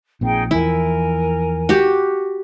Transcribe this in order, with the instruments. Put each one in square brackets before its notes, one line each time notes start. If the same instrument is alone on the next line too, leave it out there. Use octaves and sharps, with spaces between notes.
[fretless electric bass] A#1 A#2 C4 [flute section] D#4 G#4 G5
[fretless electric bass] E2 E3 F3 [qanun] E4 [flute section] A#4 G#5
[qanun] F#4 G4